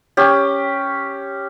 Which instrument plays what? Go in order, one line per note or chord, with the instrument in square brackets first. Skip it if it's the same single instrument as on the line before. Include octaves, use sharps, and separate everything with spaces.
[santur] C#4 G4